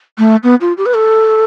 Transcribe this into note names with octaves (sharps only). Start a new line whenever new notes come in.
A3
B3
F4
G4
B4
A4